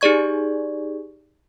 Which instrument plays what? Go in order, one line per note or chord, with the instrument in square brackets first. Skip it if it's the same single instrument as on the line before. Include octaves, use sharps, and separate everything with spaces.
[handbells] D#4 G4 G#4 D5 C#6 G#6